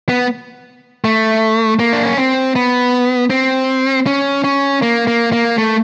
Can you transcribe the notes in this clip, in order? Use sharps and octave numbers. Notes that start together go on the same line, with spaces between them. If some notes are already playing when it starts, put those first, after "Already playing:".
B3
A3
A#3
D4
C#4
C4
B3
C4
C#4
C#4
A#3
A#3
A#3
A3